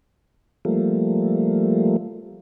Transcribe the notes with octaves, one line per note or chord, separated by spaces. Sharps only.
F3 G3 A3 A#3